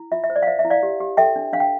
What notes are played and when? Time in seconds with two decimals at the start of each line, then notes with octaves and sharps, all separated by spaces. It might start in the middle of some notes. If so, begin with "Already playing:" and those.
Already playing: E4
0.12 F4 E5
0.24 E5
0.30 C5
0.36 D5
0.42 F5
0.47 C5 E5
0.59 E5
0.65 E4
0.70 D5 F5
0.83 G4
1.00 G4
1.17 A4 E5 G5
1.36 D4
1.53 D4 F5
1.60 G5